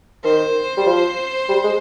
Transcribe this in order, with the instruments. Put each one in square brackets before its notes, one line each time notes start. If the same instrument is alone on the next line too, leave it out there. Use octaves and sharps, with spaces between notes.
[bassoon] D#3 [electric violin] C5
[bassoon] G3
F3
G3
G#3